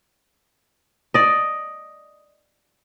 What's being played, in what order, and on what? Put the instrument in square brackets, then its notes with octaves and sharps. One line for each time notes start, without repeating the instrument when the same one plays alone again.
[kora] D5 D#5